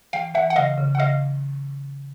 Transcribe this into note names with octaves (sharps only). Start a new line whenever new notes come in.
E3 F5 G5
E3 E5 F#5
F#5
C#3 D#5 F5
C#3
F#5
C#3 D#5 F5